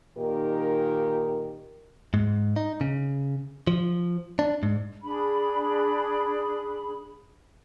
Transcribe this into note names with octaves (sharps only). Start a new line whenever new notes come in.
A#2 D#3 D#4 G4 A#4
G#2
D#4
C#3
F3
D4
G#2
D4 G#4 B5